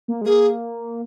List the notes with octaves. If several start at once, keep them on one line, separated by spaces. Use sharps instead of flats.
A#3
G#3
A#3 G#4